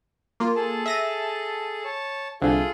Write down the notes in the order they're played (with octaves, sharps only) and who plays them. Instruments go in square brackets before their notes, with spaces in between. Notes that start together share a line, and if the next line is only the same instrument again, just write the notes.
[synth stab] A#3 F4
[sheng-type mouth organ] G#4 A4 A5
[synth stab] E5 A#6 D#7
[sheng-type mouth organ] C#5 A5
[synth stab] C2 D3 [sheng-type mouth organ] F4 G#4 A4